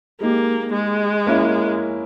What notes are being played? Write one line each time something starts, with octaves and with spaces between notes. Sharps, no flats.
G#3 A#3 D#4 G4
G#3
A#3 C#4 E4